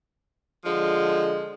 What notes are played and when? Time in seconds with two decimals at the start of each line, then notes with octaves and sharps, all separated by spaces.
0.65 D3 F3 G#3